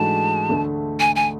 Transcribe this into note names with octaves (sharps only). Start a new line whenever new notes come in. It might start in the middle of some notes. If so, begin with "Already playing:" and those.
Already playing: G#2 E3 A3 D4 F#4 A5
D2 D3 A3
G#5
G#5